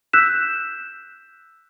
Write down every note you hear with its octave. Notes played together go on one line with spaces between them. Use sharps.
E6 F#6 G6 B6 E7